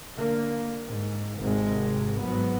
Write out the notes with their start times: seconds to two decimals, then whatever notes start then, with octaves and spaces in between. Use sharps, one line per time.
0.14 D3 A#3
0.86 G#2
1.38 G#1 G#2 C3 G#3
2.21 G#2 F#3 B3